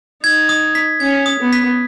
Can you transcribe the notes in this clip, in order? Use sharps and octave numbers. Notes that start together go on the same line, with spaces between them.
D#4 G#6
D#6
B6
C#4 G#6
D#6
B3
B6